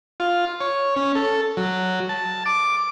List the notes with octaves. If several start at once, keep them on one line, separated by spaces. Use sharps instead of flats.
F4
C#5
C#4
A4
F#3
A5
D6